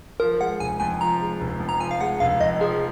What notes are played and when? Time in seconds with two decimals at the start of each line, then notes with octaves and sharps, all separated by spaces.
0.20 F3 A#4
0.40 G#3 F#5
0.60 F1 G#5
0.80 F2 G#5
1.01 F3 A#5
1.21 G#3
1.41 F1
1.60 F2
1.69 A#5
1.80 F3 G#5
1.91 F5
2.00 G#3 F#5
2.20 F1 F5
2.40 F2 D#5
2.60 F3 G#4